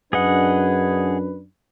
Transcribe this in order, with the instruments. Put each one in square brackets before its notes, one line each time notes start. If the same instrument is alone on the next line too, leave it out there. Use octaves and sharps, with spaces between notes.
[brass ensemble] F#2 D4 [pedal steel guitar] G#4 D#5 F#5 [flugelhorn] B4